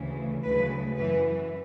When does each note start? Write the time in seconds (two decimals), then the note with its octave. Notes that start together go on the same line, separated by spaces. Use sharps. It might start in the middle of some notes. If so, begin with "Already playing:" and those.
Already playing: D2 C#3 E3
0.43 D2 C#3 F#3 B4
0.97 F#2 E3 B4